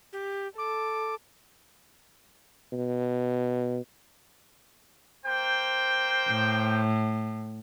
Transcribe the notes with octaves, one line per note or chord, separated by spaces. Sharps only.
G4
A4 D6
B2
A#3 C5 G5
A2